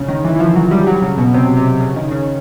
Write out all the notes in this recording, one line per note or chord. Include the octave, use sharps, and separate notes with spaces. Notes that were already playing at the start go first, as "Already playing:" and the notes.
Already playing: C#3
D#3
E3
E3
F3
F#3
G3
F#3
C#3
B2
C3
C3
C#3
D#3
C#3